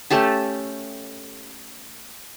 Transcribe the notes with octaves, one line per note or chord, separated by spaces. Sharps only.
A3 C#4 G4 A5